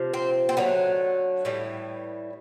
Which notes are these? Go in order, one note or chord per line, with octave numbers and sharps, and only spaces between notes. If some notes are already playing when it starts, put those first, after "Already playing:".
Already playing: C3 F3
C4
C4
D3 F#3 A3 B3
A2 E3 G3